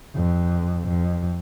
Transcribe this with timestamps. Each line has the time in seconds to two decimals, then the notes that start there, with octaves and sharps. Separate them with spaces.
0.15 F2
0.88 F2